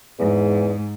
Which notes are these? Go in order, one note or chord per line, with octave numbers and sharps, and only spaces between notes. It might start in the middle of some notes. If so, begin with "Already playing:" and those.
E2 G#2